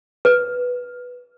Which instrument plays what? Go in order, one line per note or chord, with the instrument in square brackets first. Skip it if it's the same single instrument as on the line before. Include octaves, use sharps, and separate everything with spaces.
[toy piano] B4